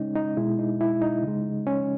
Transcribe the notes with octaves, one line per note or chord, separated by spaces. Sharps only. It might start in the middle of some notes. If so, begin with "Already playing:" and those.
Already playing: C#3 G#3 C#4 D#4
D#4
B2 G#3 E4
D#4
E4
D#4
C#3 G#3
C#4